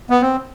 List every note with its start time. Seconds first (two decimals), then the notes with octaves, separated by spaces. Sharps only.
0.10 B3
0.22 C4